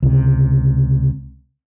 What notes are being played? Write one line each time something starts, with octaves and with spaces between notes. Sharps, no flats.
C#2 C3